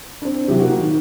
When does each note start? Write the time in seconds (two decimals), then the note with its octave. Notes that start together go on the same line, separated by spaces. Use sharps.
0.22 C4 D4
0.48 C3 E3 F#3 G4
0.59 A#3 F#4
0.78 D#3